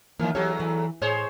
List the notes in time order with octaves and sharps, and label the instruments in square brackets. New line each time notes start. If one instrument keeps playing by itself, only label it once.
[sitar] D#3 E3 [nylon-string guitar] F#3 A#3
[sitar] E2 F#3 A4 [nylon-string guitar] G4 C#5
[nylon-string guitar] E3
[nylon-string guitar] A2 [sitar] G#4 C5 C#5